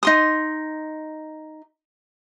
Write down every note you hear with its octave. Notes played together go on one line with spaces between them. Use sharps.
D#4 C6 D#6